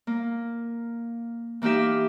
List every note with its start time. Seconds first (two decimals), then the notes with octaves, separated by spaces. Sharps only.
0.07 A#3
1.62 E3 A#3 D#4 G4 E5